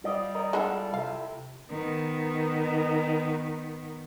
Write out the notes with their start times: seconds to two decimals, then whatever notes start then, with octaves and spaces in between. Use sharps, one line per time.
0.04 G3 F4 D5 D#5
0.35 A#4 D#5
0.53 G#3 D4 E4 F4 A4 F#5
0.94 C3 F5
1.70 D#3 B3